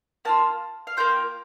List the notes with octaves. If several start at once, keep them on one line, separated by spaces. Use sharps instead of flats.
A#3 D4 F4 A5
F5
A#3 D4 F4 G5